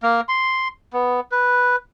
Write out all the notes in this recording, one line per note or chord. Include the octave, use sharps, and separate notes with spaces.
A#3
C6
B3
B4